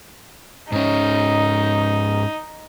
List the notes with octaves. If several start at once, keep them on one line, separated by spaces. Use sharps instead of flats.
G#2 C#4 D#4